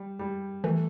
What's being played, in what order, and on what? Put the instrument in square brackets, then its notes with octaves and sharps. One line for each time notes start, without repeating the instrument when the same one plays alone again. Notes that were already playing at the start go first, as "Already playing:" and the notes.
Already playing: [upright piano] G3
G3
[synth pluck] E3 [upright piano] A3